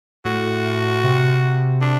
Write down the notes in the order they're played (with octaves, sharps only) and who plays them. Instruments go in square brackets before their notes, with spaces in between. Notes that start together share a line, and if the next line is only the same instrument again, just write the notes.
[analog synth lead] A2 [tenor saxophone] F#4
[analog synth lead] C3
[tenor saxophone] D4